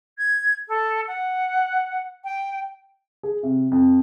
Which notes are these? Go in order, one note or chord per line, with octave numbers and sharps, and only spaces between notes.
G#6
A4
F#5
G5
G#4
C3
F2